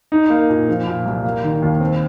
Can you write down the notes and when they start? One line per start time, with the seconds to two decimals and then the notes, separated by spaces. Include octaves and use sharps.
0.12 D#4
0.30 A#3
0.50 A#2
0.68 F3
0.87 A#2
1.06 C2
1.24 A#3
1.44 D#3
1.62 D#2
1.81 C4